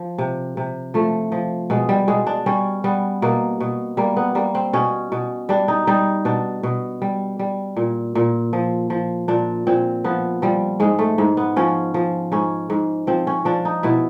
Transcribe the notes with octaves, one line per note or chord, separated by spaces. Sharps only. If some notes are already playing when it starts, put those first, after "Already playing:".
Already playing: F3
C3
C3
F3 A3
F3
B2 G#3
G3
B2 G#3
D4
G3 C#4
G3 B3
B2 A#3
B2
G3 A#3
B3
G3 A#3
C4
B2 C#4
B2
G3 D4
D#4
G3 D#4
B2 D4
B2
G3
G3
A#2
A#2
F3
F3
A#2 D4
A#2 C4
F3 B3
F3 G3
G#2 G#3
A3
G#2
B3
F3 C#4
F3
G#2 C#4
G#2
F3 C4
C#4
F3 D4
D#4
B2 E4